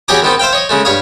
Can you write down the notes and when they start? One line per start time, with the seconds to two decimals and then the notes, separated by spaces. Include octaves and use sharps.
0.08 E2 F#3 G4 G#4 A#5 D6
0.22 D#3 B3 C4
0.39 C5 E5 F5 G5
0.53 C#5 D#5
0.69 C#3 G#3 A3
0.85 G2 C#5 F5 D#6